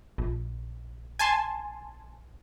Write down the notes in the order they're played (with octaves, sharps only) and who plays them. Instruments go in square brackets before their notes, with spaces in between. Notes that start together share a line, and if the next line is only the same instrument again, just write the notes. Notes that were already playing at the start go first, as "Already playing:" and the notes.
[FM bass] A#1
[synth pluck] G#5 A5 C6